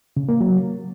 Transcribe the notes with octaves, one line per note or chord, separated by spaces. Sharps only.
C#3
A#3
F#3